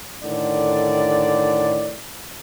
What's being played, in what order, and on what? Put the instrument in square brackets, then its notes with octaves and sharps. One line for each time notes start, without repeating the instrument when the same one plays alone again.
[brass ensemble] A2 D3 D#3 D5